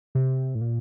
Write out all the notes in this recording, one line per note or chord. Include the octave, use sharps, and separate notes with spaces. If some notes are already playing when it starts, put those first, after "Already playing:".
C3
A2
A#2